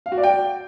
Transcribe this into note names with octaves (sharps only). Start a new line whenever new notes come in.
F5
F#4
D5
G5